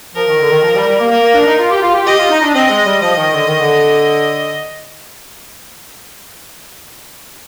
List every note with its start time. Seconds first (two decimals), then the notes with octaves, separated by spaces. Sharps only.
0.15 F3 A#4
0.27 D#3
0.39 D3
0.51 D#3
0.62 F3
0.75 G3
0.87 G3
0.99 A#3
1.10 A#3 A#4
1.22 A#3
1.34 D4
1.46 D#4
1.59 F4
1.71 G4
1.82 F4
1.94 G4
2.06 G4 D#5
2.18 F4
2.30 D#4
2.42 D4
2.54 C4 D#5
2.69 G#3
2.85 G3
3.02 F3 D#5
3.17 D#3
3.33 D3
3.47 D#3
3.60 D3